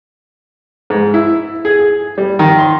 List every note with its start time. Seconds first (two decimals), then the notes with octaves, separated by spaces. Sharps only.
0.90 G#2
1.14 E4
1.65 G#4
1.79 G#4
2.18 G3
2.39 D#3
2.59 C6